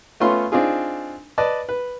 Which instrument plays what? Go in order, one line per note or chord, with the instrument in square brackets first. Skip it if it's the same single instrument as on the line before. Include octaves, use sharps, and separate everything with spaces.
[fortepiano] A3 B3 C#4 F4 C6
C4 D4 D#4 F4 G#4
B4 D5 D#5 A5
B4